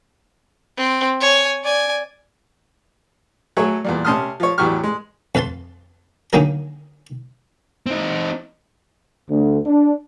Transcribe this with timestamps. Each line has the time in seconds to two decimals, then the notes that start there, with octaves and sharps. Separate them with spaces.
0.77 C4
1.20 C#5 G#5
1.64 D5 G#5
3.57 F#3 A3 G#4 C#5
3.85 E2 A#2 G3
4.05 C3 C#4 A5 C6 D#6 F6
4.40 F3 C#5
4.58 E2 A2 F#3 G4 C#6 F6
4.84 G#3
5.35 F2 B4 F5 A5 C6
6.33 D3 D#3 F#3 A#3 G#4 A#4
7.86 C4 D#4
9.30 D2
9.66 D4